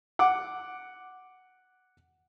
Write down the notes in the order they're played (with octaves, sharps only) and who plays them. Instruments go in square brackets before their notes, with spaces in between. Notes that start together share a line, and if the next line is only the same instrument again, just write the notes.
[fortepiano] F#5 D6